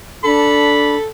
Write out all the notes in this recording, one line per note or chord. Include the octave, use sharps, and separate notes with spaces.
D4 A4 B5